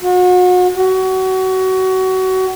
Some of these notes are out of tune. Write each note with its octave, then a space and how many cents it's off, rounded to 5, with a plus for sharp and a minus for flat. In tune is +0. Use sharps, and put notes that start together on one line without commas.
F#4 -35
F#4 +25